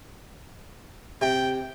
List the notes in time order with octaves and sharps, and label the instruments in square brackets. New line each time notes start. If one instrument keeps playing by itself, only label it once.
[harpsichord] C3 [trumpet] G5